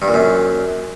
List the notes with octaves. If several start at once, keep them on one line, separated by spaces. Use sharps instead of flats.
G2
A#2
F#2